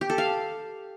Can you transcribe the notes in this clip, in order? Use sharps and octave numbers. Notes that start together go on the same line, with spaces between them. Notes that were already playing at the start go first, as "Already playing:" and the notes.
G4
A4
F5